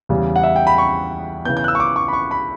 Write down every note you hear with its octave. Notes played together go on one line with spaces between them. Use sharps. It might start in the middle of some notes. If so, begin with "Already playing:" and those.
E2 C#3 G3
F#5
E5
G5
B5
C#6
C#3 E3 B3 G6
G6
F#6
E6
C#6
D6
C#6
B5
C#6
B5